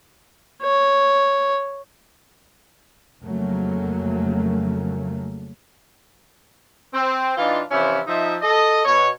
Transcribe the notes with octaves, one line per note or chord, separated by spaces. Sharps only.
C#5
F2 C#3 F#3 A3 A#3
C4
E3 D4 D#4 F4
C3 E3 F3 C#4 E4
F3 D#4 E5
A4 D#5
B2 C#5